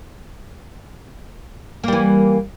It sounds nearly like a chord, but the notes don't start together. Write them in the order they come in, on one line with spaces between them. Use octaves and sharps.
A#3 G3 E3